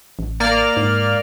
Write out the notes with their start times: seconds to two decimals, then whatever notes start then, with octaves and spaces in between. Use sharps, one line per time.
0.19 A1
0.40 A#3 D5 F6
0.77 G#2